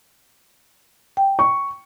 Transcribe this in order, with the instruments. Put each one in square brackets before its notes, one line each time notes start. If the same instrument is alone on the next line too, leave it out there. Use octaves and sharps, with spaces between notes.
[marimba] G5
[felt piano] C#6